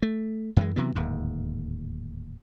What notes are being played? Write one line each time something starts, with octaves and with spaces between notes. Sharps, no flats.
A3
F#2 E3 G#3
C3 E3 F#3 B3
D1 D#2 G#2